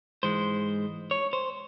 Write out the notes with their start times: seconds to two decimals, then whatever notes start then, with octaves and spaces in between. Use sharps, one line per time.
0.23 G#2 E3 G#3 C5
1.11 C#5
1.33 C5